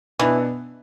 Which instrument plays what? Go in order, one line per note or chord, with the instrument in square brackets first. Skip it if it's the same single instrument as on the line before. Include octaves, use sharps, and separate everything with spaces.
[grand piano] B2 B3 D4 [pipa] E3